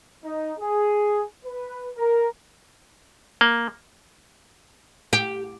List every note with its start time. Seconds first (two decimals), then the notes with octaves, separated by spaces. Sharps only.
0.25 D#4
0.59 G#4
1.46 B4
1.97 A#4
3.41 A#3
5.13 G4